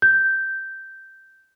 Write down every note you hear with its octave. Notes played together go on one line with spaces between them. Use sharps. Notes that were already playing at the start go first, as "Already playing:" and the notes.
G6